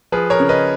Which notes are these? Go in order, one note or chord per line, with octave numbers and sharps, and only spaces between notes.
F3 G#4 B4
A#4 C#5
C#3
B4 D#5